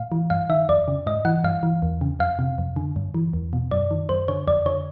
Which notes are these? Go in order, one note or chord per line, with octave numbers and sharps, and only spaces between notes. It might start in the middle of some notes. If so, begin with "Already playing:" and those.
Already playing: A2 F5
E3
G2 F5
D#3 E5
F2 D5
C#3
G#2 D#5
E3 F#5
G2 F5
E3
E2
C#3
F2 F5
C3
F2
D3
G2
E3
E2
B2
F#2 D5
D#3
F#2 C5
D3 C#5
F2 D5
D3 C#5